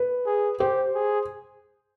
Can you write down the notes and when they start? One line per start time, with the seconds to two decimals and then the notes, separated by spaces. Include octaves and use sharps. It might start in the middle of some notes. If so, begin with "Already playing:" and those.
Already playing: B4
0.26 G#4
0.60 G4 C5
0.95 G#4